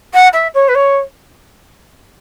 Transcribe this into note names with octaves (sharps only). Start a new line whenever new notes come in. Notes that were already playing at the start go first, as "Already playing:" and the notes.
F#5
E5
C#5
B4
C#5